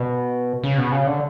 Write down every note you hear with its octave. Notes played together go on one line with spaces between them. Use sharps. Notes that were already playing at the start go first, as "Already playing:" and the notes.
Already playing: B2
C#3
B2
C#3
D3